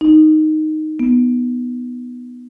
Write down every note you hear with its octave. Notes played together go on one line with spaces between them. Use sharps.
D#4
B3